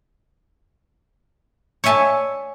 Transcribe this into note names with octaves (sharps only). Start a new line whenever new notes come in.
C#5 D5 E5 G#5 A5